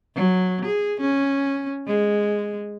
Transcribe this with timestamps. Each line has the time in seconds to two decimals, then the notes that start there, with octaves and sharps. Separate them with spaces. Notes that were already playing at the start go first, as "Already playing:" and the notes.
0.16 F#3
0.65 G#4
1.01 C#4
1.87 G#3